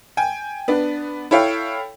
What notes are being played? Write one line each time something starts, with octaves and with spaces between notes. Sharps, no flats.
G5 G#5
B3 D4
E4 A4 C#5 F5 G5